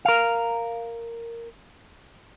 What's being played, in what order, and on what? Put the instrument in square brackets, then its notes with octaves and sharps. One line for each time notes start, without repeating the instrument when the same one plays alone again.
[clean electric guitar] A#4 F5